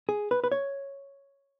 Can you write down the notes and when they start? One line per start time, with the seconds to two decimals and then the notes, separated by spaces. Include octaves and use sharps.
0.09 G#4
0.31 B4
0.44 B4
0.52 C#5